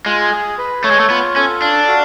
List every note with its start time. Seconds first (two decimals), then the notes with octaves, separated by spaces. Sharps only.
0.06 G#3 F4
0.32 G#4
0.58 B4
0.84 A3 C#5
0.91 G#3
1.00 A3
1.10 B3 F4
1.36 C#4 A4
1.62 D4 F5
1.88 F#4